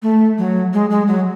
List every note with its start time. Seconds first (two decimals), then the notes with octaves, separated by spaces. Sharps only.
0.03 A3
0.38 F#3
0.73 G#3
0.90 G#3
1.07 F#3